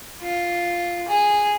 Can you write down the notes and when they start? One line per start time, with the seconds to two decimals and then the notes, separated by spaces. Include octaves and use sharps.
0.21 F4
1.08 G#4